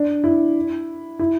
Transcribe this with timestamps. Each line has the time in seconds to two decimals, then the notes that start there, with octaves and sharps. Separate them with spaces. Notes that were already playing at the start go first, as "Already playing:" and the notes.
Already playing: D4
0.24 E4
1.19 E4